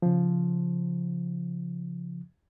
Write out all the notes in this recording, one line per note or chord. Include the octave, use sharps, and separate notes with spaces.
C#3 F3